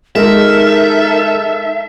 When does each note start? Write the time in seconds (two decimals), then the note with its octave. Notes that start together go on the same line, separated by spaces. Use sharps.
0.15 G#3 D#4 A4 A#4 E5